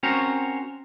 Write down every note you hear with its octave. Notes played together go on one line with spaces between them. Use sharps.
C4 C#4 F#4 A#4 C5 C#5